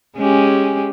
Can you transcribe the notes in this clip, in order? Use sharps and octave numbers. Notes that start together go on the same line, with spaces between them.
G#3 C#4 G4